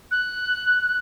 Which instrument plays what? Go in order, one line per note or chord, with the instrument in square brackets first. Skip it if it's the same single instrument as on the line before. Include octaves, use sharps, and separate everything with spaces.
[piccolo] F#6